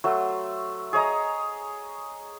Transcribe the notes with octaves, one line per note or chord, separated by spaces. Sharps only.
F#3 A3 C6
G#4 C#5 D#5 A#5